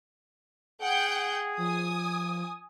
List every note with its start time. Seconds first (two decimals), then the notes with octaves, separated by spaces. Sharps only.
0.81 G#4 F#5 G5 G6
1.57 F3 G#5 D#6